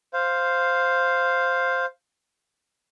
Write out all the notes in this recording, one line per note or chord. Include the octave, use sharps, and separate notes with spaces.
C5 F5